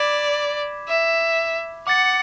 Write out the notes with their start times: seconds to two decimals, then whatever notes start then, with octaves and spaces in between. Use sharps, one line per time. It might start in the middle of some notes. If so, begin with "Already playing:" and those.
Already playing: D5 B5 D6 G#6 B6 E7
0.88 E5
1.87 F#5 D6 A6 C#7